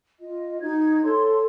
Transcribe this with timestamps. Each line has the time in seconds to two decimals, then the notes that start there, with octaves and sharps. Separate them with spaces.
0.20 F4 D#5
0.61 D#4 F#4 G#6
1.03 A4 C#5 C6